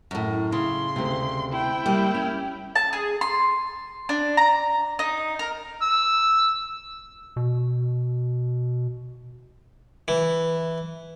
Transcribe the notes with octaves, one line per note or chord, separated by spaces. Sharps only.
F#2 A2
C#3 E4 C6
D2 C3
E4 G5
G3 A#3
C#4
A5
G#4
C6
D4
A#5
D#4
A#4
E6
B2
E3